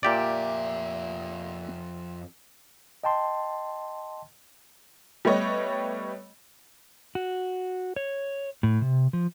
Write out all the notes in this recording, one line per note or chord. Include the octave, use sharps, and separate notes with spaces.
F2 A#2 G4 D5 E5
D#5 G5 A5 C6
G3 A3 B3 C#5 D#5
F#4
C#5
A2
C3
F3